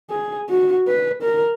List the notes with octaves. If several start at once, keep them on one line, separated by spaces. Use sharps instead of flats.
G#4
F#4
B4
A#4